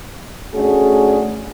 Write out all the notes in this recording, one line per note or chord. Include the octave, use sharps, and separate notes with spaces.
A3 C#4 D4 F#4 G#4